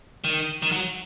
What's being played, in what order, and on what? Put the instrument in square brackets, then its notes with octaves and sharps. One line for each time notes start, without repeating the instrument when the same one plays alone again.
[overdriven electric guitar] D#3
D#3
F#3